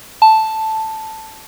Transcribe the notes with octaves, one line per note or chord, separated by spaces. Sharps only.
A5